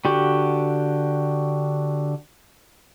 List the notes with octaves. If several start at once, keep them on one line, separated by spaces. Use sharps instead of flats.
D3 F#4 G4